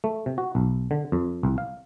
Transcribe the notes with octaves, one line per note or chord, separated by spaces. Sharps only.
A3
C3
F#4
B1
D3
F2
C2
F5